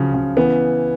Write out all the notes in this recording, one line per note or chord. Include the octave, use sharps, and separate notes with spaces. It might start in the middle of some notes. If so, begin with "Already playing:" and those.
Already playing: C#3 F3 F#3
C#3
E3 B3